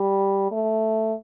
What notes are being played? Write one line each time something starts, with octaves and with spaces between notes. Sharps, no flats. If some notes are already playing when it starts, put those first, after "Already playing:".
Already playing: G3
A3